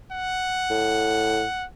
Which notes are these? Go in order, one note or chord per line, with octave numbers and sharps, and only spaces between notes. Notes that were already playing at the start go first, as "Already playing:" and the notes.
F#5
A2